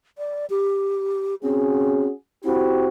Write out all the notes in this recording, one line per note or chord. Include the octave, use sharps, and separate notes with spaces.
D5
G4
C4 C#4 F#4 G#4
C4 E4 F#4 G4